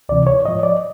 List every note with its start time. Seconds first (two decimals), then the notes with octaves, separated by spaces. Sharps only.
0.09 D2 C3 E3 D5
0.27 C#5
0.45 G#2 F3 D#5
0.63 D5